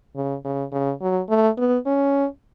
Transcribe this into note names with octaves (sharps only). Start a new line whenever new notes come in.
C#3
C#3
C#3
F#3
A3
B3
C#4